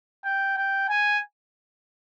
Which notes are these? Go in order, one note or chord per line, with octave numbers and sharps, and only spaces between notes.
G5
G5
G#5